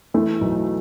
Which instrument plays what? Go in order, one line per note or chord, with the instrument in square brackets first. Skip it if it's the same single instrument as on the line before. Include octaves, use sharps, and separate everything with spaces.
[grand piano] E3 [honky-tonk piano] A3
[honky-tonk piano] B1